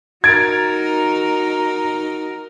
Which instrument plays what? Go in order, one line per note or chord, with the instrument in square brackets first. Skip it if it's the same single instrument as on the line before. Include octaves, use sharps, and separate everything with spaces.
[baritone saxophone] D#4 [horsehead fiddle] F#4 A#4 [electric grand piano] G#6 A6 D7